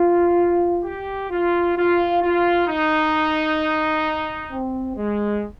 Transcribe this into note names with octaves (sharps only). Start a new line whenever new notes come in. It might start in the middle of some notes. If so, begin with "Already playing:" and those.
Already playing: F4
G4
F4
F4
F4
D#4
C4
G#3